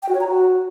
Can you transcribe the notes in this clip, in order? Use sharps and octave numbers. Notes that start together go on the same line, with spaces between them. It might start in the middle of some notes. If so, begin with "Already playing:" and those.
G5
F#4
C#5
A#5
F#4